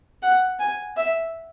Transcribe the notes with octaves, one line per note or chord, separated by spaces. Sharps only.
F#5
G#5
E5